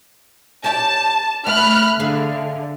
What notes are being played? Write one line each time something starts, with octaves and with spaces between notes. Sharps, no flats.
G4 C#5 D5 A5
A3 B5 F6 F#6
D3 G#4 E5 F5